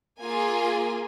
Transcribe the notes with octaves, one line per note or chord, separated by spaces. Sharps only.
A#3 F4 G#4 G#5